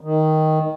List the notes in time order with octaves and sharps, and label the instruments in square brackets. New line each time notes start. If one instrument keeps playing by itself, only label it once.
[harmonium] D#3